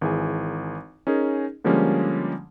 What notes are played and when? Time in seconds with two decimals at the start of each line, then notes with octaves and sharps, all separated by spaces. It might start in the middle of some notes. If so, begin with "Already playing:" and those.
0.01 G#1 E3 G#4 G#5
1.07 C#4 D#4 G#4 A#4
1.64 D3 F3 G3 G#3 A#3 C#4